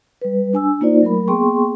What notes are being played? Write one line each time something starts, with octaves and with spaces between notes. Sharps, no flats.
G3 B4
D4 G#5 E6
A#3 D#4 F4 C5 D5
F#3 A3 A#4 B5
A#3 B3 G#4 G5 C6 C#6